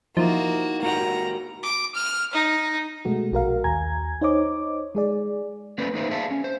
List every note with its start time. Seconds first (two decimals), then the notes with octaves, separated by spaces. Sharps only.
0.17 F3 A#3 D#4 E4 F#4 E5
0.83 A#3 F#4 G4 A#5
1.63 D6
1.95 F6
2.33 D#4
3.05 B2 G#3 A3 F#4
3.32 A#1 F#4 A#4 F5
3.64 D#2 G#5 A#5 G#6
4.21 D#4 C5 C#5 D#5 D6
4.95 G#3 G#4 D5
5.78 A3 A#3 C#4 B4 C5 D5
5.94 A#3 D#4 B4 C5 E5
6.10 G#4 C5 D5 E5 F5 A5
6.31 C#4
6.44 C5